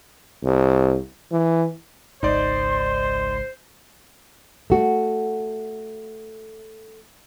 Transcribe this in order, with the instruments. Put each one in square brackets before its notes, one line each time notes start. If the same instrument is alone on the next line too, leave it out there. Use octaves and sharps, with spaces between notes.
[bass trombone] C2
E3
[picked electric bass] G#1 C#2 G#2 [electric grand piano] D#4 D5 [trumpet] C5 [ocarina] C6
[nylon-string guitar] A3 F#4